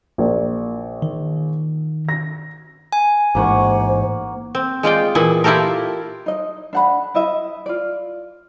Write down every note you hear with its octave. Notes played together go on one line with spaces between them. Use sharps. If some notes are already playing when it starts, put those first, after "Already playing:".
A#1 A#4 D5
D#3
A#6
G#5
A1 G#2 A#3 C5 F#5 C#6
C4
G#3 F4 D5 G5
A#2 E3 E4 G#4
E4 F4 G4 A4 A#4
D#4 D#5
D4 F#5 B5
E4 D#5 E5
F4 D5